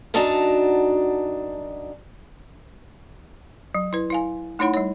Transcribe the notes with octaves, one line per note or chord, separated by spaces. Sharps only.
F#2 D4 D#4 F#4 A5 A#5
F#3
E4 B4
E4 F5 G#5
A3 D#4 E4 C#5 F#5 B5
G3 C#5